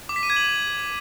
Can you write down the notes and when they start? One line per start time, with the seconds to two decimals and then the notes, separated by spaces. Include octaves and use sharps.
0.09 D6
0.16 B6
0.23 D#7
0.30 G#6
0.36 F#7